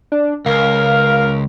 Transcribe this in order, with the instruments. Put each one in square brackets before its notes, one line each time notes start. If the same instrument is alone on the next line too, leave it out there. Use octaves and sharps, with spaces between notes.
[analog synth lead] D4
[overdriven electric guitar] C#2 [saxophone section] A#4 [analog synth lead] F5